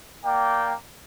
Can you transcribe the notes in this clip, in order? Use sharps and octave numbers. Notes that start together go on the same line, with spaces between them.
A#3 D5 G5